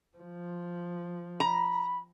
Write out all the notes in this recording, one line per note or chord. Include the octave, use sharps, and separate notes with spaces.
F3
A#5 B5